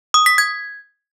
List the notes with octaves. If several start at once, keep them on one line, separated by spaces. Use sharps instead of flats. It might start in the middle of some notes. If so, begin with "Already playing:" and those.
D#6
B6
G#6